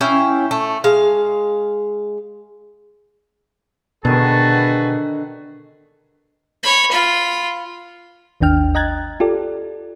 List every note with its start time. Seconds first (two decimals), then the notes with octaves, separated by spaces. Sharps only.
0.01 C#4 E4 F5 G5
0.51 A3
0.84 G#3 F5
4.05 B2 D3 D#3 F#4 G#4 B4 A5
6.63 C#5 B5
6.91 F4 B5
8.41 G#1 D#2 D4 G5 F6
8.75 D#5 G5 A#5 F#6 G#6 A6
9.20 F4 G4 A4 D5